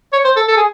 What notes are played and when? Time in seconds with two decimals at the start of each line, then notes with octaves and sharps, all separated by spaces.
0.13 C#5
0.25 C5
0.36 A4
0.48 A4
0.57 G#4